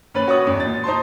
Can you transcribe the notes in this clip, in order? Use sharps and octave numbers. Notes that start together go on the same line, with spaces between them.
D#2 C#4 B4 A6 F#7
F#4 C#5 C#6 D#6
G#1 E2
A#2 A6
D#4 C5 A5 C6